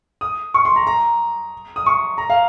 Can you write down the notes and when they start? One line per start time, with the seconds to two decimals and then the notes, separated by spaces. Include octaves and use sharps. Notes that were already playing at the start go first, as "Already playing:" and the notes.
0.21 D#6
0.54 C#6
0.65 C6
0.76 A#5
0.87 A#5
1.76 D#6
1.86 C#6
2.18 A#5
2.30 F5